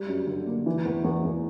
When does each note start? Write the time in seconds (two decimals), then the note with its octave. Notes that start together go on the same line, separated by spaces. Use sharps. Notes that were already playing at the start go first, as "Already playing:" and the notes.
Already playing: G3
0.08 F#2
0.27 D3
0.47 A#3
0.66 E3
0.85 E2
1.04 E2
1.24 E2